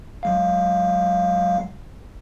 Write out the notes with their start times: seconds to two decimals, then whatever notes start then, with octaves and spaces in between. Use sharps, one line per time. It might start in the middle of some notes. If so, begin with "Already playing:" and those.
0.23 F#3 G#3 F5